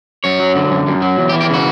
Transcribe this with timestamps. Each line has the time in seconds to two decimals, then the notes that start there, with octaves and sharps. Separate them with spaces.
0.24 F#2 C#5
0.40 F#3
0.55 D3
0.71 F#2
0.87 F#2
1.02 F#3
1.18 E2
1.29 G4
1.34 E3
1.41 G4
1.49 C#3 F#4